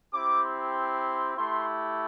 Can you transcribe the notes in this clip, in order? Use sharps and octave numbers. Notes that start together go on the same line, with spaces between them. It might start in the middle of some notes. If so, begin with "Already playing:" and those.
C4 E4 G4 D6
C6
A3 E4 G4 C6